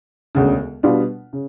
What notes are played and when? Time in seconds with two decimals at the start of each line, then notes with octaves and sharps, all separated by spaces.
0.35 E1 D2 C#3
0.83 B2 G3 B3 D4 F4
1.33 C#3